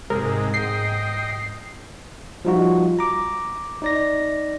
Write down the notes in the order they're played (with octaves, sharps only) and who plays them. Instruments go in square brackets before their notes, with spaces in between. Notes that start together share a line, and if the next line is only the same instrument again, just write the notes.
[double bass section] G#2 [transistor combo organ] C3 G#3 [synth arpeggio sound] A#4
[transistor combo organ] D#5 G5 [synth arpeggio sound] C7
[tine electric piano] F3 G3 D#4 F4 F#4
A#5 D6
D#4 D5 A#6